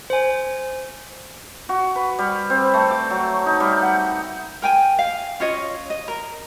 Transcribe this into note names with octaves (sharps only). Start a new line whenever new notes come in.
C5 G#5
F#4
B4
G3
C4
A3
D6
F#3
D#4
G3
F#5
A#4 G5 G#5
F5
C#4 F4 C#5 D#5
D#5
A#4